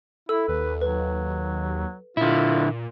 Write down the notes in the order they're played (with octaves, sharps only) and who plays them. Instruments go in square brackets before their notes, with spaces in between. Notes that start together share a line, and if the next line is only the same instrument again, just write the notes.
[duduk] E4 [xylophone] A4 E6
[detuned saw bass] D#2 [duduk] B4
[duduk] F#3 [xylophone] B4
[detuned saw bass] A#2 [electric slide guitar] D3 E4 [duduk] F4